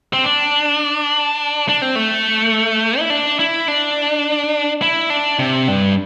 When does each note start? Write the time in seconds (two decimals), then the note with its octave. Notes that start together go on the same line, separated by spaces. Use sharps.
0.13 C4
0.24 D4
1.69 D4
1.82 C4
1.96 A3
2.99 E4
3.10 D4
3.39 E4
3.68 D4
4.82 E4
5.10 D4
5.39 C3
5.68 G2